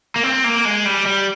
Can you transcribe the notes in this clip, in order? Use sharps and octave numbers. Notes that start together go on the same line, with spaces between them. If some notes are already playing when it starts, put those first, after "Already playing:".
A#3
C4
A#3
G#3
G3
G3